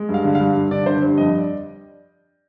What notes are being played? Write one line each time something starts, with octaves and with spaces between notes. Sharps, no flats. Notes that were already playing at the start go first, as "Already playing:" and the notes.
Already playing: G#3
G2
F5
D3
F5
G2
G2
D3 D5
D3 C5
G2
F2 D#5
D5